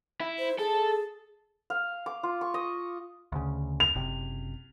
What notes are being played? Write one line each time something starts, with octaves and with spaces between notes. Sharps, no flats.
E4
C5
G#4 A4
F5
D6
F4
C#6
D#5
D2 C#3
F7
F#1 C3